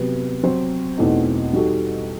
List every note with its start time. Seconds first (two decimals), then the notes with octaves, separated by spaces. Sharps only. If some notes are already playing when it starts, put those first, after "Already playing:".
Already playing: C3 F#3 B3
0.43 F#3 C4 F#4 C5
0.98 E2 B2 A3 C4 D#4
1.53 G3 D#4 F#4 A4